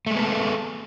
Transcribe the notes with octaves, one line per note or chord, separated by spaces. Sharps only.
G#3 A3 B3 A4